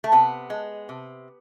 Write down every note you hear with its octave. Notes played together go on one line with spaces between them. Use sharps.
A3
C3 B3
G#3
C3